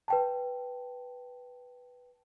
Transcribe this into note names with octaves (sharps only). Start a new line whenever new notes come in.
B4 G5 A5